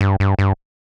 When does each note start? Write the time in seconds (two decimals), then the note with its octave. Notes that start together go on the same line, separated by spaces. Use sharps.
0.01 G2
0.20 G2
0.39 G2